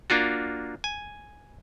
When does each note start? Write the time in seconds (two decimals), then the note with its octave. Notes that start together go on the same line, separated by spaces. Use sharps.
0.10 A#3 D4 F4 F#4
0.84 G#5